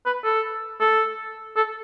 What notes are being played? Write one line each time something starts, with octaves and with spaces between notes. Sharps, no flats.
B4
A4
A4
A4